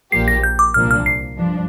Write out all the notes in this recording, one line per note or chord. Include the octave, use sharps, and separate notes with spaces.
A#1 A#2 F3 A#3 G4 C7
A#6
G6
D6
C2 A#2 F3 A#3 D4 F6
F6
C7
G2 F3 D4